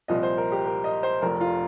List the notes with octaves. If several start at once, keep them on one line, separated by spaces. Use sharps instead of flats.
C2 A#2 F3 D#5
C5
A#4
G4
A#4
D#5
C5
F1 F2 F3 A#4
F4